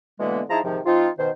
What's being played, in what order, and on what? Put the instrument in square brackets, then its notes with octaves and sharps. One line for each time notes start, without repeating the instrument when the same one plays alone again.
[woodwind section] B2 D3 E3 G#3 A#3 B3
F3 D#4 E4 G#4 A5 A#5
G#2 C3 D#3 F3
F3 C4 D#4 F4
B2 D#3 C5